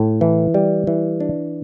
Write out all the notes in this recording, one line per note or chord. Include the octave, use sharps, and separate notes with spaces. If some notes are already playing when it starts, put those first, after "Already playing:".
Already playing: A2
E3
G3
E3
D4